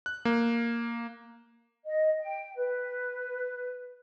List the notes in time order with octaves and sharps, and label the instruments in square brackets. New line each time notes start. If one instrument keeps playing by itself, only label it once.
[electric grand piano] F#6
A#3
[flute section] D#5
G5
B4